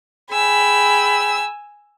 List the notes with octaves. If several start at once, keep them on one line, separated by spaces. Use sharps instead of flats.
G#4 G5 G#5 B5 E6